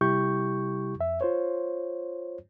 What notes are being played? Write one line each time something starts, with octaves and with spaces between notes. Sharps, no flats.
C3 G3 E4 G4 C#6 G6
F2 E5
F4 C5 C#5